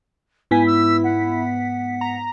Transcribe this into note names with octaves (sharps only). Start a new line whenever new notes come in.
G#2 B3 E4 G#5 B6
E6
F#5
A#5